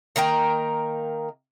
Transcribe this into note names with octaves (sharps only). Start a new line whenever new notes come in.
D#3 A#3 A#4 G5